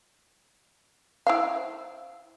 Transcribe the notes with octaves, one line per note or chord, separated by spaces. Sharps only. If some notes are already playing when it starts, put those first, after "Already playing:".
E4 C5 F5